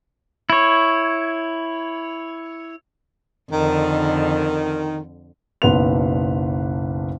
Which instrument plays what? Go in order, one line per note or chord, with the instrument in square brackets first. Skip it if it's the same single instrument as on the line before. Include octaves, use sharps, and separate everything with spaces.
[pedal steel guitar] E4 C#5
[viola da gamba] F2 D3 [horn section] D#3
[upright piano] F#1 B1 B4 F#5 C6 F7